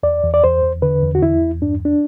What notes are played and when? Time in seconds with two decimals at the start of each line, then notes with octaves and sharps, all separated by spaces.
0.03 E2 D5
0.23 E2
0.34 D5
0.44 E2 C5
0.63 E2
0.82 D3 B4
1.03 E2
1.15 F#4
1.22 E2 E4
1.42 E2
1.61 G2 D4
1.85 D4